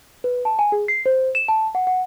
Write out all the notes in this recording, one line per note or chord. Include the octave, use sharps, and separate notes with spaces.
B4
A5
G#5
G#4
C7
C5
E7
A5
F#5
F#5